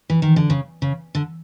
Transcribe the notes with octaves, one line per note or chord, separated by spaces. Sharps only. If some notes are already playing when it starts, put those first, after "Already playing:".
E3
D#3
D3
C#3
C#3
D3